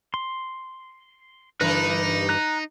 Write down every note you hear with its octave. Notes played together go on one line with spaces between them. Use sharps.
C6
G2 D3 E3 D#4 A#4 B4 B5
A#5 F#6